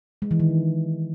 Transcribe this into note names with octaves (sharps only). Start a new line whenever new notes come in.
G#3
E3
D#3